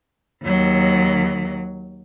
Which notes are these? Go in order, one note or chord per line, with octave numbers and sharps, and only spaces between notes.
D#2 F#3